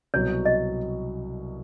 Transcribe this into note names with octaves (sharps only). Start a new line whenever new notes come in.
C2 B2 F#3 C#5
D#5